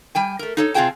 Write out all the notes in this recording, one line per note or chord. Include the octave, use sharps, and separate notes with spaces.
G3 G5 G#5
A3 A#4
D#4 A4 C#5
C3 C4 F4 G#4 G5 A5